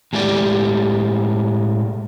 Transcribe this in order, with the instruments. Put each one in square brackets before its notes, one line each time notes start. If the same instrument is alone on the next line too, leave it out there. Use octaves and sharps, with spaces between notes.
[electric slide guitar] A2 G#3 A3 G4 D5